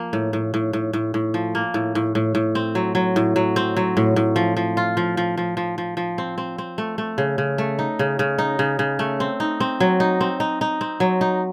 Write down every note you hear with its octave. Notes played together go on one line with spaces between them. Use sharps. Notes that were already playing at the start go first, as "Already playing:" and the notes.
Already playing: F3 A#3
A2
A2
A2
A2
A2
A2
F3
A#3
A2
A2
A2
A2
C4
F#3
F#3
A2
F#3
C4
F#3
A2
A2
F3
F3
F4
F3
F3
F3
F3
F3
F3
C4
C4
C4
A3
A3
C#3
C#3
A3
D#4
C#3
C#3
D#4
C#3
C#3
A3
C4
D#4
C4
F#3
D#4
C4
D#4
D#4
C4
F#3
D#4